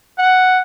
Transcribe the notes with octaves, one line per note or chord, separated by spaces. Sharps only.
F#5